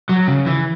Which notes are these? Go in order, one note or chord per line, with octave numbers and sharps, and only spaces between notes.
F#3
C#3
E3